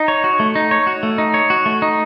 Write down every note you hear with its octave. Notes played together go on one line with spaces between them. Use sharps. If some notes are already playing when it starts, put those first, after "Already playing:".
Already playing: D#4
C#5
F#4
A3
D#4
C#5
F#4
A3
D#4
C#5
F#4
A3
D#4